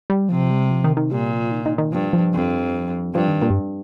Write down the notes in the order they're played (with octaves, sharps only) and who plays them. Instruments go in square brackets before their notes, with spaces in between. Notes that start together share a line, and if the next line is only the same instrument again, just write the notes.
[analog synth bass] G3
[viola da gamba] C3 [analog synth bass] F3
[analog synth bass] G3
F3
D#3
D#3
[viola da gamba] A#2 [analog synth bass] G3
[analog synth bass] F3
D#3
D#3
D#3
[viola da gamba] G2 [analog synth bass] F3
[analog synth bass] F3
[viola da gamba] F2
[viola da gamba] G2 [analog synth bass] F3
[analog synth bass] D#3
A#2
G2